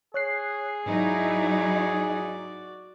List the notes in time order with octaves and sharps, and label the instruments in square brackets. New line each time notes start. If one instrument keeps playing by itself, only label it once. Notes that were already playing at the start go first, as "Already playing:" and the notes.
[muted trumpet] G#4 [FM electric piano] C#5 F#6 C7
[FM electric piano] G#2 [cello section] F#3 D#4 E4 [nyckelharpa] F#4 D5